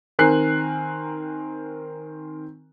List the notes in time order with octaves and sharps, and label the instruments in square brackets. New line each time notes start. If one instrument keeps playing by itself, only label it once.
[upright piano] D#3 C4 A#4 G#5 F#6 C7